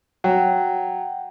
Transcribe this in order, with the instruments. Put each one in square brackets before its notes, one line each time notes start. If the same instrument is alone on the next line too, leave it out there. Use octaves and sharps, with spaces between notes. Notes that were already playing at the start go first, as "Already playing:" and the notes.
[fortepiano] F#3 [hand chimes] F#5 G5